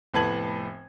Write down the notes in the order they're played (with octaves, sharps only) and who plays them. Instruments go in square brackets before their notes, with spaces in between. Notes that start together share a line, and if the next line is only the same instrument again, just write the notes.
[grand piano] F1 A2 B3 A5 G#6 F#7